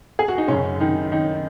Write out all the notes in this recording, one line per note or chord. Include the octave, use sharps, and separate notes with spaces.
G#4
F#4
D#4
F#2 C#3 C#4
D#3 D#4
D#3 D#4